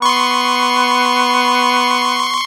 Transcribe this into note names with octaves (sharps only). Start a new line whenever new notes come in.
B3 C6 C#6